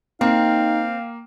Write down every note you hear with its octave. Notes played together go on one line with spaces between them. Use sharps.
A#3 C4 D#4 F5